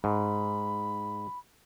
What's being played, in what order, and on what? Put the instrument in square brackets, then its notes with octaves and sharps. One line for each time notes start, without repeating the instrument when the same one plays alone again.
[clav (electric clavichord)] G#2 [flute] B5